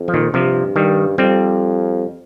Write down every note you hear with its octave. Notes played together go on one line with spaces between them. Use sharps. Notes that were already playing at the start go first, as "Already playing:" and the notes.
Already playing: F2
F3
A#2 D#3
G2 C3 F3
G2 D#3 G3
F2 G3 C4